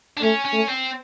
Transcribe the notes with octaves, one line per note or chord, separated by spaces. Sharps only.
D4
A3 C#4
C#4
A3
C4